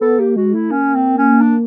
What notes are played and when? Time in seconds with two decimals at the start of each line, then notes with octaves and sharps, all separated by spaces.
0.01 B3 A4
0.19 A#3 G4
0.36 G#3 F#4
0.54 A3 E4
0.71 A#3 C#4
0.94 C4
1.18 C#4
1.41 D4